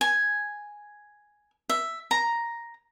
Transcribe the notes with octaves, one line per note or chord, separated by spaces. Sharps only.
G#5
E5
A#5